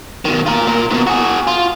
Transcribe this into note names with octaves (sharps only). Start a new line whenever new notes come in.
B2 D#3
F4 A#4
A#2 A#4
G#2 B2
F#4 G#4
F4